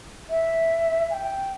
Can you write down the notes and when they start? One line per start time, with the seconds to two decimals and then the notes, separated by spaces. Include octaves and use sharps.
0.30 E5
1.10 G#5
1.14 G5